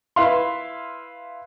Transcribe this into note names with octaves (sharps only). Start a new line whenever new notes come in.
E4 B4 E5 F5 C6